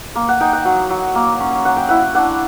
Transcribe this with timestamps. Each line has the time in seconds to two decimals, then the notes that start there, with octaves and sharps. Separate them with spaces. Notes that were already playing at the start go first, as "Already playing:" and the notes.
0.15 A#3
0.28 F#5
0.40 D#4 G5
0.53 F#5
0.65 F#3
0.90 F#3
1.15 A#3
1.40 C#4
1.65 F#3 F#5
1.77 G5
1.89 E4 F#5
2.14 D4 F#5